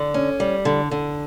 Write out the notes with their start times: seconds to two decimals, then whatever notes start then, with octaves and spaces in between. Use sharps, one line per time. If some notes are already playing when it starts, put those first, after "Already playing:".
Already playing: D3
0.14 C#4
0.40 G3
0.65 D3
0.91 D3